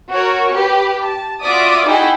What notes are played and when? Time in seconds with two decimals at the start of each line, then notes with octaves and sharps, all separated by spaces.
0.11 F#4 A#4 C#5
0.52 G4 B4
1.00 A5
1.41 F4 F#4 D5 E5 D#6
1.85 D#4 E4 F#4 G#4 G5